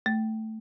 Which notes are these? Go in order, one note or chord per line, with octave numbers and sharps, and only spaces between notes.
A3